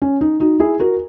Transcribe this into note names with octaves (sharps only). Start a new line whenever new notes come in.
C#4
D#4
D#4 F#4
E4 G#4
F#4 A#4